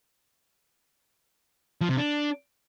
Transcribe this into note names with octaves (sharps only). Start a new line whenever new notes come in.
F3
C3
D4